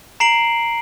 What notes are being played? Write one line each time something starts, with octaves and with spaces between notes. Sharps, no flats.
A#5 C7 D7 F#7